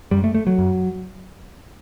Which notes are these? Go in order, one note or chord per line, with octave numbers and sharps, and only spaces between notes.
F#2 G3
A3
A3
F#3
F#2